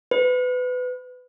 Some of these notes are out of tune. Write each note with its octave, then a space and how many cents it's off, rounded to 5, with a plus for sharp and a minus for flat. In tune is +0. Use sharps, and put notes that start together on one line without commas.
B4 +20